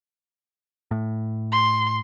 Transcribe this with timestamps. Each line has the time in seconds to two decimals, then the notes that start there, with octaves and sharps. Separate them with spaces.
0.91 A2
1.52 C6